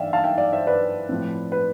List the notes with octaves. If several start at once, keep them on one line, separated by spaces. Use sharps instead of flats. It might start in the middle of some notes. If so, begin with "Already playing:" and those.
Already playing: E3 D5 E5 F5 G5
F5 A5
E5 G5
D5 F5
C5 E5
B4 D5
A2 F3 C4
B4